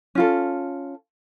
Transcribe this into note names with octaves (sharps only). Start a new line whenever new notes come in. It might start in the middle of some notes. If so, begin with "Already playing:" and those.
C#4 F4 A4